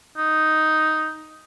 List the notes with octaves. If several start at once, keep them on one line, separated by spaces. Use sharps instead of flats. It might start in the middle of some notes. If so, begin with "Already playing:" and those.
D#4